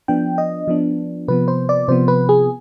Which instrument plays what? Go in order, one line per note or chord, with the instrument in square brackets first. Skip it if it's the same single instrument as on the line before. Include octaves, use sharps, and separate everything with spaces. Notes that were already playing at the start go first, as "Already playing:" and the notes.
[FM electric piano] F3 B3 D4 G5
D#5
F3 B3 D4
C3 F3 B3 B4
C5
D5
C3 F3 B3 C5
B4
G#4